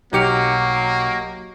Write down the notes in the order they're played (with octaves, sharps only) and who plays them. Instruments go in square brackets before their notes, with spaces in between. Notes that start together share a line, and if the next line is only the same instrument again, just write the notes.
[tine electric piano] B1 D6 F6 [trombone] F#3 [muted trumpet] A#3 [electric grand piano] D#4 G4 C#7